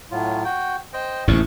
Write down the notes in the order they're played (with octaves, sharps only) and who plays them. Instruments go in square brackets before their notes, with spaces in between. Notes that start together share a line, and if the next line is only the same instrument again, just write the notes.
[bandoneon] A2 F#3 F4
F#4 G5
C5 D#5 G5
[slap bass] A1 D#2 C3 [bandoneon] C#6 D#6